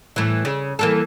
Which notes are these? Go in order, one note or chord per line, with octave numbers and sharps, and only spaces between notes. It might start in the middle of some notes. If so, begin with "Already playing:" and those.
A2 E3
C#3
E3 A#3 A4